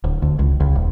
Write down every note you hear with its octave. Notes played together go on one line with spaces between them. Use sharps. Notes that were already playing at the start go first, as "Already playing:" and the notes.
D1
D2
C#2
C#2
D#1